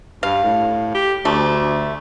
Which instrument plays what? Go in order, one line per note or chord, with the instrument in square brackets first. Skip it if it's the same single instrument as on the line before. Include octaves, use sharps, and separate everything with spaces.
[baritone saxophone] G2 [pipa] F5
[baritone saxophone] A2
G4
[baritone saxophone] D2 [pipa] A3